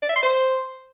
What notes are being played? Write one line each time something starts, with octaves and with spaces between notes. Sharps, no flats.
D5
E5
C6
C5